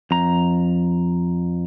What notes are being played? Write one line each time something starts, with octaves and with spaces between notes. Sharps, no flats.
F2 A#5